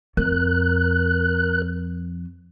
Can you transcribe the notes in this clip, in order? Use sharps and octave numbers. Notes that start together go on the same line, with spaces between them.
F2 A#4 F#6